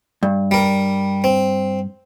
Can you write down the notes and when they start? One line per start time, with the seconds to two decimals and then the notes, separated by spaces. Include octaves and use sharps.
0.23 G2
0.51 G3 A#4
1.24 C4